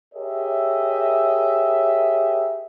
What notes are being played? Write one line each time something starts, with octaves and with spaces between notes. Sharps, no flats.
G4 G#4 A#4 C#5 D#5 E5